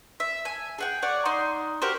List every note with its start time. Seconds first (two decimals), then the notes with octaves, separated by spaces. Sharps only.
0.20 E5
0.45 G#5
0.78 G#4 F#5 G5
1.02 C#5 D5 F#5
1.25 D#4 C6
1.82 F#4 G4 A#4 C5